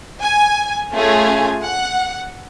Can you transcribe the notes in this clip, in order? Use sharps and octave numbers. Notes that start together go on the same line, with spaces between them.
G#5
A3 C#4 F4 G#4 G#5
F#5